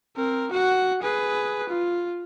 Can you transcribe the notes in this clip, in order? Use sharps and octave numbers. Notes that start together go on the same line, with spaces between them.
C4 A#4
F#4 F#5
G#4 B4
F4